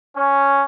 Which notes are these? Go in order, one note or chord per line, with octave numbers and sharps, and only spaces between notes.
C#4